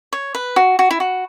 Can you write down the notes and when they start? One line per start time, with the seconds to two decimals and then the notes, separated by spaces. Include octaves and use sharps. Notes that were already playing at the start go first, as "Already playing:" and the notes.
0.13 C#5
0.35 B4
0.56 F#4
0.79 F#4
0.91 E4
1.00 F#4